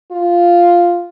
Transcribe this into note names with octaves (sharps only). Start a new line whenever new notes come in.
F4